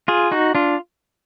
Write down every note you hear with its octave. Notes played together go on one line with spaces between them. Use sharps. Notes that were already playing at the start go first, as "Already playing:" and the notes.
F4 G#4
D#4 F#4
D4 F4